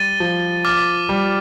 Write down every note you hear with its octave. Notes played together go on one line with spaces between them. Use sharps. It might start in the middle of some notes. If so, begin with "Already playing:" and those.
Already playing: G3 A6 D#7 G7
F3
D6 F6 A6
G3